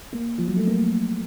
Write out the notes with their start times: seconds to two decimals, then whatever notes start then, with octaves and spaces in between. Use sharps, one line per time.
0.13 A#3
0.38 F3
0.48 F#3
0.57 A3
0.67 A#3